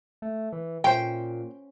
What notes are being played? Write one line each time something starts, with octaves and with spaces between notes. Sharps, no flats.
A3
E3
A#2 C#4 C5 G5